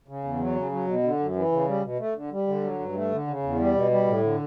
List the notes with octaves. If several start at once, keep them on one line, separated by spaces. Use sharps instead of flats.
C#3
E2
F#3
C#3
F#3
B2
D3
F#2
E3
C#3
G3
B2
A3
D3
G3
D3
F#3
G2
A3
D3
C#3
E2
G3
B2
G3
A2
D3